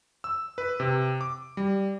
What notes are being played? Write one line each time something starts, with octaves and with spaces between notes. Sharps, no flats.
E6
B4
C3
D6
G3